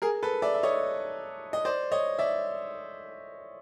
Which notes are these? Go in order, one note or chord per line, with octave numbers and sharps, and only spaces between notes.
G#4 A#4
A4 B4
D5 E5
E5
C#5 D#5
D#5
C5 D5
C#5 D#5
D5 E5